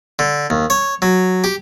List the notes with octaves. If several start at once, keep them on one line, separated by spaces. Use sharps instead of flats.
D3
D#2
C#5
F#3
G4